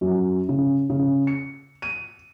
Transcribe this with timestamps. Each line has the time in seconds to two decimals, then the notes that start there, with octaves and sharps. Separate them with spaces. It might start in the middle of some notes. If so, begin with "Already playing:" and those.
0.01 F#2
0.49 C#3
0.90 C#3
1.27 C#7
1.82 D#7